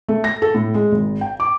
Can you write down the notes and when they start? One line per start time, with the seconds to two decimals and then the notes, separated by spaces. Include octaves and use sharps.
0.08 A3
0.24 A#6
0.42 A4
0.55 A2
0.74 G#3
0.92 G#1
1.21 G5
1.40 D6